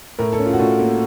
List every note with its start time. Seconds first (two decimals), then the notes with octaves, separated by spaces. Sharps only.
0.19 A2 A#4
0.33 A4
0.39 C#4
0.46 F4
0.53 F#4
0.59 A2 F4
0.79 A#3